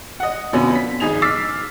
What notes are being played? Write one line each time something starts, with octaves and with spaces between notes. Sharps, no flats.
D#5 F#5
F2 B2 D3 B3 C#4
B6
G#1 D#4 G#4 F7
D6 E6 F6 A6 B6 C7